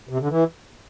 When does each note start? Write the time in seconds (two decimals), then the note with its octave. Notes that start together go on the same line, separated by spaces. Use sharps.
0.09 C3
0.19 D3
0.29 E3